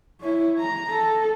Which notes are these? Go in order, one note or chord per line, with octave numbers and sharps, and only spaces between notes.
E4 C#5
A#5
A4